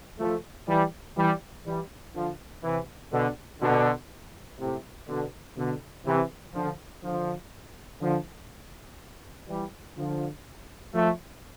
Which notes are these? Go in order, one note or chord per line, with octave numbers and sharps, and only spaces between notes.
F3 A3
E3 G3
E3 G3
E3 G3
D3 F3
C3 E3
B2 D3
B2 D3
A2 C3
B2 D3
B2 D3
C3 E3
D3 F3
D3 F3
D3 F3
E3 G3
D3 F3
F3 A3